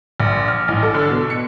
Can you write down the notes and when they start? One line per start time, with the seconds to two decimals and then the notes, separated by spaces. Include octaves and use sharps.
0.20 A#1
0.48 F6
0.68 A1
0.83 A4
0.94 D3
1.11 B2
1.30 C#7